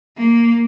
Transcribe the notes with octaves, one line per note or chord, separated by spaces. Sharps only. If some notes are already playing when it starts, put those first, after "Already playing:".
A#3